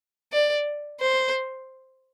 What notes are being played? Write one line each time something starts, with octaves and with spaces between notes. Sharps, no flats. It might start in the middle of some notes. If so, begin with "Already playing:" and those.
D5
C5